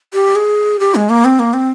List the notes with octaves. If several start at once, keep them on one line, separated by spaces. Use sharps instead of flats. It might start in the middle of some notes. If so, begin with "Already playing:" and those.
G4
G#4
G4
G#3
A#3
C4
A#3
C4